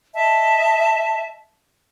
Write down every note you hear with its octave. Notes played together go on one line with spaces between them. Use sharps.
D#5 E5 A5